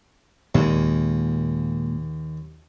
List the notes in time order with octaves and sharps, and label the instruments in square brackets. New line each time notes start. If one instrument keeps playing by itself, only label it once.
[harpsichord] D#2 [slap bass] A#2 G#3